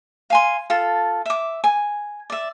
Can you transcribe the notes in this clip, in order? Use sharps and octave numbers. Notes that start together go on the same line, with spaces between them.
F5 G#5 C6
F4 A4 A5
E5 D6
G#5
D5 E5